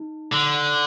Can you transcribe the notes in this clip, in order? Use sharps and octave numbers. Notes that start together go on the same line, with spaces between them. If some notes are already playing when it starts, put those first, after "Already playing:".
Already playing: D#4
D3